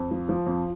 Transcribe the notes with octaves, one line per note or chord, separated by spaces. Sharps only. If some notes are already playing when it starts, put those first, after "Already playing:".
Already playing: F2
F3
F3
F2